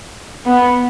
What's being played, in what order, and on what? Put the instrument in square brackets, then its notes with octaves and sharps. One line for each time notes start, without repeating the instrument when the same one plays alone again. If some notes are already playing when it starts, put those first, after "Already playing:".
[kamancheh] B3